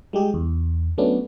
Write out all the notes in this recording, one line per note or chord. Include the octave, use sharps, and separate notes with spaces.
G3 G#3 G4 G#4
E2
F#3 A3 B3 C#4 D4